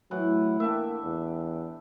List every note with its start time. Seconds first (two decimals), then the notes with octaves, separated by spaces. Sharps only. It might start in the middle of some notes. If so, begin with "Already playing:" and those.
0.11 A2 E3 F#3 F#5
0.60 A#3 D4 G4 E5
1.04 E2